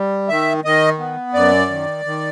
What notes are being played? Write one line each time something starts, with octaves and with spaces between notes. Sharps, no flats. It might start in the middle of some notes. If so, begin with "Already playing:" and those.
Already playing: G3
D#3 E5
D#3 D#5
B3
F#2 D5
D#3
D#3